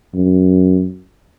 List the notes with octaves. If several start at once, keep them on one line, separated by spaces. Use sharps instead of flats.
F#2